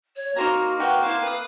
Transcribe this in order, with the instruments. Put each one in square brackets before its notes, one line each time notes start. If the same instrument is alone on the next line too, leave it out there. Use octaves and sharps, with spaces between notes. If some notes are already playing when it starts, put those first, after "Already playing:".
[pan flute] C#5
[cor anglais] A#3 [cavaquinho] D#4 C5 A#5 [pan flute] F#4
[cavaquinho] F#4 C#5 G5 [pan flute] B4
[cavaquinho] E4 C5 [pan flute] F5
[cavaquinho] B4 D#6